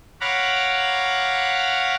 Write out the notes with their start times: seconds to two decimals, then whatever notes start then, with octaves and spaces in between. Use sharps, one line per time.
0.21 C#5 F5 F#5 A#5 B5 D6